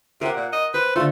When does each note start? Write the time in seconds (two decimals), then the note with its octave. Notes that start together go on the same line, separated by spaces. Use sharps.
0.21 C3 A#4 F#5
0.36 A#2
0.53 D#5
0.74 B4 C5
0.96 D3 A3 F4